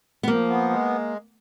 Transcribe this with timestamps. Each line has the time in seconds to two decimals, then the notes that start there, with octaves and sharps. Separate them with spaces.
0.23 B3
0.28 F3 A#3
0.49 B3
0.70 G#3